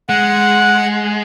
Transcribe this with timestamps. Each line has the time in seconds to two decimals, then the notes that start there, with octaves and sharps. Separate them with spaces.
0.09 G#3 F#5